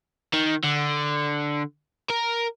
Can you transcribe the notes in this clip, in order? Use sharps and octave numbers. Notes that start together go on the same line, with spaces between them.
D#3
D3
A#4